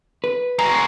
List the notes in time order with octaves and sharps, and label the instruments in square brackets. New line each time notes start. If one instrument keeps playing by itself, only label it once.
[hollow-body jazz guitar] B4
[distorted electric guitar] G#3 F#4 [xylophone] A#5